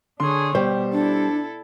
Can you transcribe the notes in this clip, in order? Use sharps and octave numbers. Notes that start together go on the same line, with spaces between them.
D3 D4 G#4 C#5 C6
B2 G3 G4 C5
D4 E4 A4